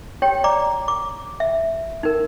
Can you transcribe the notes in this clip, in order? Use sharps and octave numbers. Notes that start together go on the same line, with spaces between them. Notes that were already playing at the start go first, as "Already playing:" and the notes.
G4 C#5 G5
D5 A#5 D6
D6
E5
D#4 A#4